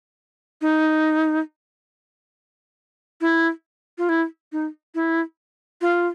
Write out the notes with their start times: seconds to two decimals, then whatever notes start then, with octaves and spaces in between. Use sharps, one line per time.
0.61 D#4
3.21 E4
3.98 F4
4.09 E4
4.52 D#4
4.95 E4
5.81 F4